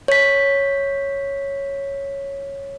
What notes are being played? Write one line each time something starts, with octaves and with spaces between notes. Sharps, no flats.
C#5 B6